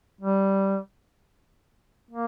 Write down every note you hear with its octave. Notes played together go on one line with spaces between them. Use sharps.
G3
A#3